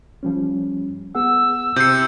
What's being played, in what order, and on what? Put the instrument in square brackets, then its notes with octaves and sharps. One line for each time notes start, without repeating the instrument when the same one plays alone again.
[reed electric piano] F3 G3 C#4
[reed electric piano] B3 G#4 F#5 [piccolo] E6
[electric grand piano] C3 C7 [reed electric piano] E4 [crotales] G6 C#7